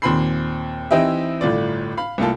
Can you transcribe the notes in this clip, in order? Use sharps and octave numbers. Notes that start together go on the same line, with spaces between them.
D#2 A#2 C4 B5 C6 C7
E3 C4 D#4 E4 G4 E5
G1 A2 F4 D5
F5 B5
C2 A3 A#3 F4 A4